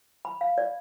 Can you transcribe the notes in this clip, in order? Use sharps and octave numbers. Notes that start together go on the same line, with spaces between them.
B5
F5
D5